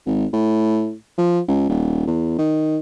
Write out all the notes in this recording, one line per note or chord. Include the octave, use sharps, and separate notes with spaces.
G#1
A2
F3
C#2
D#1
E2
D#3